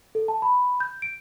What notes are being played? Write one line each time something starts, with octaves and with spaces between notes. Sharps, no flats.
A4
A5
B5
G6
D7